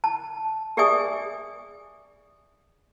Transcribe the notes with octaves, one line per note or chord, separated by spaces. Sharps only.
A5
G4 G#4 D5 E5 G#5 D#6